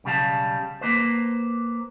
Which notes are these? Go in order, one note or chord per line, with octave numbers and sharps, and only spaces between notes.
B1 C#3 G3 F5 A5
A#3 B4 C5